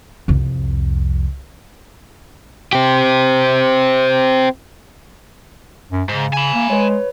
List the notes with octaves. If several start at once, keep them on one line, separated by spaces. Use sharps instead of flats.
C2 F2
C4 G4
F#2
G#2 C#3
G#5 B5
A#3
G#3 B4 C#5